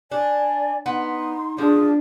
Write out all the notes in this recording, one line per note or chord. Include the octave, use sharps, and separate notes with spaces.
D4 D5 G#5
B3 D#4 C6
F3 D4 G#4